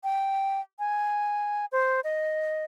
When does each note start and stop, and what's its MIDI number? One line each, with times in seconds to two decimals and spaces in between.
0.03 0.60 79
0.79 1.65 80
1.72 2.00 72
2.04 2.65 75